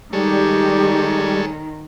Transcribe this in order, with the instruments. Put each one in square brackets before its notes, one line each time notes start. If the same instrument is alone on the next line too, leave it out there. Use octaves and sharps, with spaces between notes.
[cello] D#3 [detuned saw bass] G3 [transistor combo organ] G#3 A4 C#5 [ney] G4